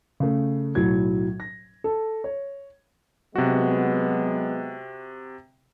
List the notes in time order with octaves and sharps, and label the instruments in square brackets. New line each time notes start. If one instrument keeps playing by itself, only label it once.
[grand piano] C#3 A3
B1 A2 F#3 G#6
A#6
A4
C#5
[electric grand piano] C3 F#4 [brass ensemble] F#3 G#3 B3